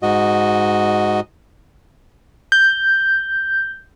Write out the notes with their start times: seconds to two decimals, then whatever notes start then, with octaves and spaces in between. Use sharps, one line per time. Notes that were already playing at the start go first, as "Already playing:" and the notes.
0.03 G#2 F#4 D#5
2.52 G6